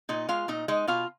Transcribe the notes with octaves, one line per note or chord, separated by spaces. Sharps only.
A#2 D#4 D#5
G#3 F4 F5
A#2 D#4 D#5
G#3 D#4 D#5
B2 F4 F5